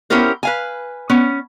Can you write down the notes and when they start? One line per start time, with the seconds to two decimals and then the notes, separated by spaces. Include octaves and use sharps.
0.10 B3 C#4 E4 G4 A#4 C5
0.43 B4 F5 G#5
1.10 B3 C#4